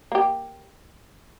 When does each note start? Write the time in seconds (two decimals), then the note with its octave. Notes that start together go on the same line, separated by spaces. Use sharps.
0.12 A#3 G4